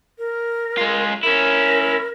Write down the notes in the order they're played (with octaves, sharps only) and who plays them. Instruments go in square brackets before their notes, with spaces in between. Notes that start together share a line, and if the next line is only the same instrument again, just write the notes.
[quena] A#4
[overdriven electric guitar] G#3 F4
[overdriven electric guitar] C#4 E4 [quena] A#4